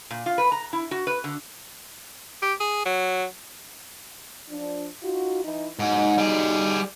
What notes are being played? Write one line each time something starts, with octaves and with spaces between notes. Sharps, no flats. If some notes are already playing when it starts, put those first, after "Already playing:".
A#2
F4
B4
A#5
E4
F#4
B4
D3
G4
G#4
F#3
F3 D4
D#4 F4 F#4
E3 D#4 E4
G#2 B2 F#3 D#4
G3 G#4